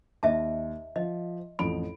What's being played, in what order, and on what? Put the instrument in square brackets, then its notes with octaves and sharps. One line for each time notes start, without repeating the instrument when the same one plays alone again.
[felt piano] D#2 [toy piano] D#5 E5 A5
[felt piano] F3 [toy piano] D#5
[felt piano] A1 F2 D7 [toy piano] B5